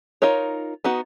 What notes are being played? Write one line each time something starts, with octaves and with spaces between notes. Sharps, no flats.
D#4 F4 A#4 C#5
B3 D#4 F#4